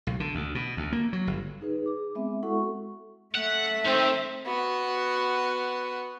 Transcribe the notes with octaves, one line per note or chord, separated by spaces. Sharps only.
B1
D3
D2
B2
D2
A#3
F#3
G1
D#4 G#4 B4
G#4 D6
G#3 B3 C4 E5
G#3 E4 F#4 A4 F#5 C#6
A3 E5 F#5
D#3 C4
B3 F#4